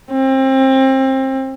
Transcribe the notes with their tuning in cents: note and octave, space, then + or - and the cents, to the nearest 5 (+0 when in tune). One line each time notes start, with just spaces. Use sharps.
C4 +25